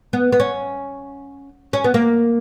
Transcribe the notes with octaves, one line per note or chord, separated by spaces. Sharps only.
B3
B3
C#4
C#4
B3
A#3